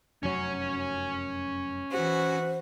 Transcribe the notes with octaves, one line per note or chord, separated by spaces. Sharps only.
F1 F#2 F#3 C#4 C#5
E3 F#4 C5